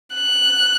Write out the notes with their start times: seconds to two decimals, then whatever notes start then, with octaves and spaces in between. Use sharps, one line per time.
0.14 F#6